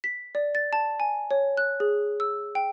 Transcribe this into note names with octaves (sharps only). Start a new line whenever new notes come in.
B6
D5
A6
A5
G#5
C#5
F#6
G#4
E6
G5